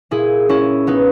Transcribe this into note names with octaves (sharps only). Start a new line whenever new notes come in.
A#2 E4 G#4
C#4 E4
B3 D#4